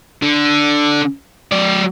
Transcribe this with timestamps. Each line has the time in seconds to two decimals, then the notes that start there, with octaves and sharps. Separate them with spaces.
0.23 D3
1.52 F#3 D5